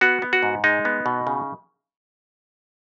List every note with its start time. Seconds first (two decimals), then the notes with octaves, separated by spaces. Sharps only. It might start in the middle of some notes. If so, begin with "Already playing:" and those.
0.01 B3 F#4
0.22 B3
0.33 F#4
0.43 G#2
0.64 G#3 D#4
0.85 B3
1.06 B2
1.27 C#3